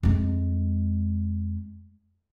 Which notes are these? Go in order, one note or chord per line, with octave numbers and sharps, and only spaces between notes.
F2 G#3